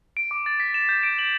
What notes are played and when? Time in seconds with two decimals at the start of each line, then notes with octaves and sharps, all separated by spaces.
0.17 D7
0.31 D6
0.46 A6
0.60 B6
0.74 E7
0.89 G6
1.03 D7
1.19 F#7